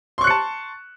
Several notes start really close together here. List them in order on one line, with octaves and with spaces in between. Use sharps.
C6 C#6 F#6 C#7 A5